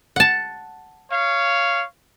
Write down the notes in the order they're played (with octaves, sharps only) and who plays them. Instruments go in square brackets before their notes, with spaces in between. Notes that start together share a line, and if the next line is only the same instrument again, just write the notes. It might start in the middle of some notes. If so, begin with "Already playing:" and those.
[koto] F#5 A5
[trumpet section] C#5 F5